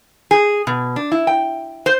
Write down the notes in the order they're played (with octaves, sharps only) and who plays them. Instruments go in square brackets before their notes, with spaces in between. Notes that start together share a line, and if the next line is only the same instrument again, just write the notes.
[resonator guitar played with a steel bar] G#4
B2
D4
E4
G5
C5